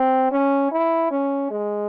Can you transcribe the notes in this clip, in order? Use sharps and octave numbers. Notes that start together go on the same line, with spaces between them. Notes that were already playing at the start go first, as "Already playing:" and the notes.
Already playing: C4
C#4
E4
C#4
G#3